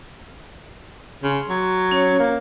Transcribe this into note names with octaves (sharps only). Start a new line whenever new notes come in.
C#3 C6
F#3
C#4 C#5
A#3